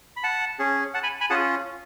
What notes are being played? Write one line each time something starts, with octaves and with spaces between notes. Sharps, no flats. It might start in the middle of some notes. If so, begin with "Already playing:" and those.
B5
F#5 A5
C#4 G#4
F#5 A5
G#5 B5
G#5 B5
C#4 F4 G#4 F#5 A5